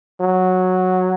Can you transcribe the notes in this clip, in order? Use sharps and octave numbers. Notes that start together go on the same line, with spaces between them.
F#3